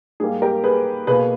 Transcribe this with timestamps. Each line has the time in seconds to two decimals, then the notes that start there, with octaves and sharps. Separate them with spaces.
0.20 G#2 G3 A#3 G#4
0.42 G4 A#4
0.64 G#4 B4
1.07 B2 A#3 G#4 B4